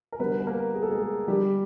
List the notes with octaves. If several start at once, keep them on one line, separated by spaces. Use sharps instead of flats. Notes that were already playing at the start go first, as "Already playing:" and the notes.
A#4
D3 G3 B3 B4
B4
A#3 A#4
G#4
A4
G#3 G#4
D3 G3 G4